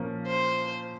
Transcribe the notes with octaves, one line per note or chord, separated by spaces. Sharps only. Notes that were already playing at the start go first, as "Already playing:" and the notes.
Already playing: A#2 F3 A#3 C#4
C5